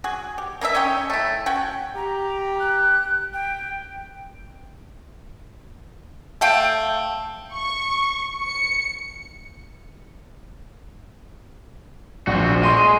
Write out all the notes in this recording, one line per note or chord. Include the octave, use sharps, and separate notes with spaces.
F#4 G#4
G4
A#3 D#4 A#4 E5
C#4 D#4 C#5 G5
A3 E4
C#4 F#4 G5
G4 A#5
F#6
G5
A3 F5 G5
C#6
C#7
A#1 C4 F#4
G#3 D#5 C6 D#7